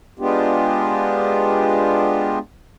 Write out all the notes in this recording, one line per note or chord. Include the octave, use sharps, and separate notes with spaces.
G#3 B3 D4 F4 G4